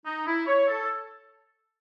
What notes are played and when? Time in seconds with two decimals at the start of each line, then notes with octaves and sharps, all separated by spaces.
0.06 D#4
0.27 E4
0.47 C#5
0.68 A4